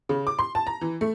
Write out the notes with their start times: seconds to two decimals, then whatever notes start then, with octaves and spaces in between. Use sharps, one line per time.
0.09 C#3
0.27 D6
0.39 C6
0.55 A5
0.67 A#5
0.81 E3
1.01 A3